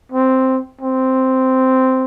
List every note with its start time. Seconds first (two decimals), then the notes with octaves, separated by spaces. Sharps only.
0.12 C4
0.81 C4